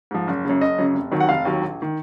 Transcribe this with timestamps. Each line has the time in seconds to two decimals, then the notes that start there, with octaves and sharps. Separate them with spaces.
0.11 G#2 F3
0.27 F#1
0.45 F#2 C#3
0.61 F#1 D#5
0.78 F#2 C#3
0.94 F1
1.12 D#2 D#3 F#3
1.20 F#5
1.28 F1 F5
1.45 D#2 D#3 F#3
1.62 A#1
1.82 D#3